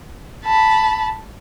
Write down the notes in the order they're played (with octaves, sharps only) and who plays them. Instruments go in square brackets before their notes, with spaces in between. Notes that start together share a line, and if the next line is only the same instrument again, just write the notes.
[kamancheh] A5 B5